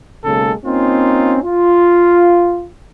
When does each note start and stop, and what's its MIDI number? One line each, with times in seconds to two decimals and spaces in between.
0.25 0.53 35
0.25 0.53 49
0.25 0.53 56
0.25 0.53 58
0.25 0.53 69
0.66 1.38 58
0.66 1.38 60
0.66 1.38 61
0.66 1.38 63
0.66 1.38 65
1.44 2.65 65